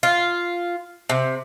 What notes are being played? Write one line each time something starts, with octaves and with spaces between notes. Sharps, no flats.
F4
C3